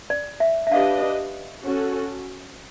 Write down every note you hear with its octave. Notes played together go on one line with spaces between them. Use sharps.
D5
E5
E5
D4 G4 B4 D#5 F5
C#4 F#4 A4